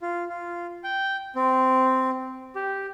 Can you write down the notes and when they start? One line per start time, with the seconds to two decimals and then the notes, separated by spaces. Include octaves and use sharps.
0.02 F4
0.29 F4
0.84 G5
1.35 C4
2.56 G4